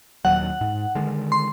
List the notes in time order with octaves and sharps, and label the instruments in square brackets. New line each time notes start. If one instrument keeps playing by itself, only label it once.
[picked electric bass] D#1 D#2 F#3 [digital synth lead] F#5
[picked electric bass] G#2
D3 D#3 G#3
[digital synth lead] C6